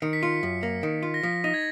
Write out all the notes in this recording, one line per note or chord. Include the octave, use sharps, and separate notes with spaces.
D#3 C#7
B6
F4 C#7
F#2
A#3
D#3
F4
A#6
F3 B6
D#4 A#6
G#6